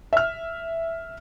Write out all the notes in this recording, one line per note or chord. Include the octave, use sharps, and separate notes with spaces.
E5 F6